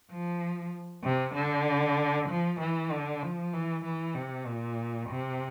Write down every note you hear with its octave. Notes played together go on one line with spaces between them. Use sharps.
F3
C3
D3
F3
E3
D3
F3
E3
E3
C3
A#2
C3